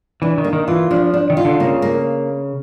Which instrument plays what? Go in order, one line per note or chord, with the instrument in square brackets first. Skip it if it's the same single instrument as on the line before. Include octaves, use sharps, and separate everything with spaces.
[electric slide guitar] E3 [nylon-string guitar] D4
[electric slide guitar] D#3
[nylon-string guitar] A#3
[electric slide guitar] D#3
[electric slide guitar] E3 [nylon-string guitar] F4
[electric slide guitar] F3 [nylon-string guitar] D4
[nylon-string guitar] D4
[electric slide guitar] D#3
[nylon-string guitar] F4
[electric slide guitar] D3
[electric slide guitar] C#3 [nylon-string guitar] A#3
[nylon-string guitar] A#3